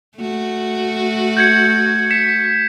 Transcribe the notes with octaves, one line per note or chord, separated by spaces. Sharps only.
A3 F#4
G6 G#6 C#7
B6 C#7 E7